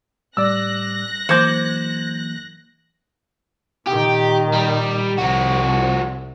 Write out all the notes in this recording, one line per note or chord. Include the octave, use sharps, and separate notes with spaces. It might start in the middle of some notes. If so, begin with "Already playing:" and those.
A2 G3 D5 E6 F#6 A#6
E3 F#3 A#3 C5 D6 G6 G#6 C#7
A#2 D#3 G4
G3
C2 F3 F#4